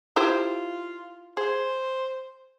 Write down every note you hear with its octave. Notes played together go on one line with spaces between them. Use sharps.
E4 F4 G4 C5
G#4 C5